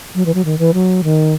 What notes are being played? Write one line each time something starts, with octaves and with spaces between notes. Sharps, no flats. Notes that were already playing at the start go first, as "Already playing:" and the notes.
F#3
E3
F#3
D#3
E3
F#3
D#3